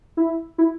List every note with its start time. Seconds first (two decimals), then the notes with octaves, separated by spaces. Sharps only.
0.17 E4
0.58 E4